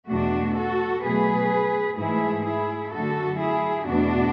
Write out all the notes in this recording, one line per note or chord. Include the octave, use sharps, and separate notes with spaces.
E2 B2 A3 D4 F#4
F#4 A4
B2 F#3 A3 G#4 B4
G#2 E3 A3 E4 G#4
E4 G#4
F#2 D3 A3 F#4 A4
E4 G#4
E2 B2 A3 D4 F#4